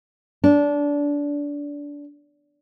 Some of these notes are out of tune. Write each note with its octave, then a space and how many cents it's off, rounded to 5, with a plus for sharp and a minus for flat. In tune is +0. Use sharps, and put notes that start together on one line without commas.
D4 -20